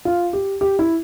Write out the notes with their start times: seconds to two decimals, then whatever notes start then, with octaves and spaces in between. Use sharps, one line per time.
0.05 F4
0.33 G4
0.61 G4
0.79 E4